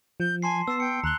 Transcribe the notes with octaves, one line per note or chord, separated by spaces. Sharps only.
F3 G6
G#5 A5 C6 C7
B3 A5 E6 C7
G5 C#7
D#2 A#5 F#6 G7